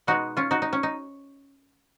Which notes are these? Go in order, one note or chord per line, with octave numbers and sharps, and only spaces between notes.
B2 G#3 B3 D#4 F#4
C#4 F4
D#4 F#4
D#4
C#4
D#4